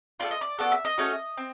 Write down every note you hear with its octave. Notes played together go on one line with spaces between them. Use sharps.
A3 C4 F4 D5
D#5
D5
B3 D4 F#4 A4
E5
D#5
A3 C#4 F#4 A4
C4